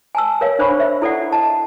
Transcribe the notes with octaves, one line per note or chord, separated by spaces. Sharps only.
G#5 A5 E6
A#4 C#5 F5
D4 C5 C#5 B5 C#6
E5
E4 A4 D5 F#5
D#5 A5